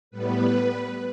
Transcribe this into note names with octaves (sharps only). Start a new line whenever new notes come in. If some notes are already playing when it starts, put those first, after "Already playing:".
A2 G3 B3 B4